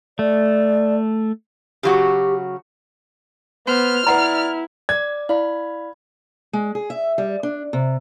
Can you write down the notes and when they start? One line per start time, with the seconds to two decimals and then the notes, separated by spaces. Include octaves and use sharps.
0.19 A3 D5
1.83 C#3 F#3 F#4 G4
3.67 B3 C5 F6
4.07 E4 B4 D5 F#5 A#5
4.89 D5 G#6
5.29 E4 D5 F5 B5
6.53 G#3
6.75 G#4
6.90 E5
7.18 G3
7.43 D4
7.73 C3